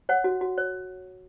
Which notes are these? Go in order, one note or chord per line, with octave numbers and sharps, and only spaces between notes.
C#5 F#5
F#4
F#4
C#5